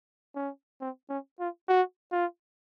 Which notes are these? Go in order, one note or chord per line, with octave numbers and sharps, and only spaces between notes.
C#4
C4
C#4
F4
F#4
F4